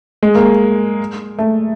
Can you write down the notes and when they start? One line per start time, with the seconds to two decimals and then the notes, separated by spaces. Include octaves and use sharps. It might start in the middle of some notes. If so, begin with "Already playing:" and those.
0.23 G#3
0.35 A#3
1.39 A3